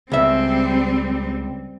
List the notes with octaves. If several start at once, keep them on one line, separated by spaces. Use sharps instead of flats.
C#2 G3 C4 E5